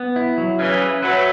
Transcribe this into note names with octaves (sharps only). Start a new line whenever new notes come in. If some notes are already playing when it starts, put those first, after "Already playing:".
Already playing: B3
E4
F#3
C#3 E3 C#4
B4
F#3 A3 B4